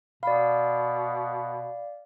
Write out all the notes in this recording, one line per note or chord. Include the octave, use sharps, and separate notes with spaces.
B2 D5 F5 B5